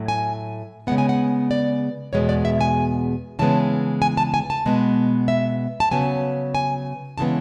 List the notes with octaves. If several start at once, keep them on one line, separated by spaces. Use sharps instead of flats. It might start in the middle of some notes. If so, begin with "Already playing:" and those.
Already playing: A2 F#3 A3
G#5
C#3 G#3 B3 F#5
G#5
F#5
D5
E2 B2 G#3 B3 C#5
D5
E5
G#5
C#3 E3 G#3 B3 A5
G#5
A5
G#5
A5
B2 G#3 B3
E5
A5
C#3 F#3 B3 G#5
G#5
C#3 E3 G#3 B3 A5